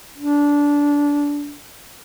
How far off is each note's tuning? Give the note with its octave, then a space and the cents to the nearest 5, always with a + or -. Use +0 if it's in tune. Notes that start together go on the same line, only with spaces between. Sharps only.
D4 -20